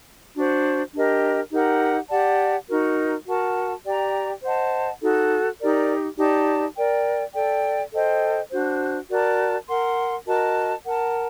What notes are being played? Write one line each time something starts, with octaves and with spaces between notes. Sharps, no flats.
D4 F#4 C5
D4 G4 A#4 D#5
D#4 G4 A#4 F#5
G4 D5 F#5 A5
D#4 F#4 A#4
F#4 A#4 F#5 A5
G4 D5 G5 A#5
C5 D#5 F#5 A5
D#4 F#4 A4
D#4 G4 A#4 D5
D#4 G4 D5 A5
A#4 D5 G5
A4 D5 G5
A4 C5 D#5 G5
D4 F#4 C5
F#4 A#4 D5 A5
A#4 F#5 C6
F#4 A#4 D#5 A5
A#4 F#5 A5